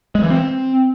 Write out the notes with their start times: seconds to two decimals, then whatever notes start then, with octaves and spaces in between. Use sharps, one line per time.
0.15 G#3
0.23 E3
0.30 C4